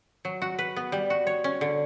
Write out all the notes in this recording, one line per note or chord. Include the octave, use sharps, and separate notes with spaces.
F#3
F#4
B4
B3
G3
F#4
C#5
C#4
D3